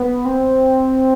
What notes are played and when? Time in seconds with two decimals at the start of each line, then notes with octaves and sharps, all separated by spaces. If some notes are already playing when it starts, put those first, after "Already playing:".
Already playing: B3
0.25 C4